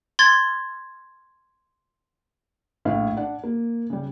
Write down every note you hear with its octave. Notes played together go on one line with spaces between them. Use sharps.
C6 G#6 A6
A#1 A2 F5
D4 F#5
A#3
C#3 G3